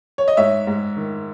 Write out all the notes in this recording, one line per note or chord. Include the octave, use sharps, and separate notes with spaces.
C#5
D#5
G#2 C#5 E5
G#2
D#3